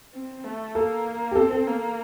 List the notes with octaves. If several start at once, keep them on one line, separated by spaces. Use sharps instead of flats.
C4
A3
A#3 A4
G4
C4 A4
A4
A#3